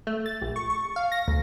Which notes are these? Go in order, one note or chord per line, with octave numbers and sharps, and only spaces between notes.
A3
A6
A#1
C#6
C#6
F5
A#6
D2